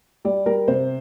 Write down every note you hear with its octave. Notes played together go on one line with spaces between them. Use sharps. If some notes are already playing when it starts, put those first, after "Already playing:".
G3 D5
G3 A#4
C3 C5